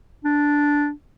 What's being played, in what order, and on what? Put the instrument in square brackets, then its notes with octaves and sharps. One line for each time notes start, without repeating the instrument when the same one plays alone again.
[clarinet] D4